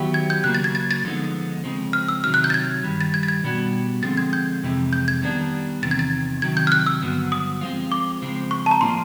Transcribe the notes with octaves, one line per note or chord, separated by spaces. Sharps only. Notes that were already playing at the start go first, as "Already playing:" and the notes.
Already playing: D#3 F#3 B3 E4 G4
G#6
G6
C#3 F#3 A#3 F#6
A6
G#6
A6
A6
D3 F3 G#3 B3 D#4
C#3 F3 G#3 C4
F6
E6
C3 D#3 F#3 F6
F#6
G6
A6
G#6
G2 D#3 G3
A6
G#6
A6
G#6
B2 G3 B3 D4 F#4
D3 F3 G#3 C4 A6
G#6
G6
F2 C3 E3 G#3
G6
G#6
D#3 G3 B3 D4
E2 C3 D#3 A6
G#6
A6
C3 D#3 F#3 G#6
G6
F6
F#6
E6
G2 D3 F#3 B3
D#6
F3 G#3 C4 F4
D6
C#3 F3 G#3 C4
C#6
A5
A#5
A2 F3 A#3 D4 F4 C6